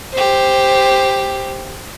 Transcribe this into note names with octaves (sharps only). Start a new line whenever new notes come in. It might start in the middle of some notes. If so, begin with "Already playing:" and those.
G4 C5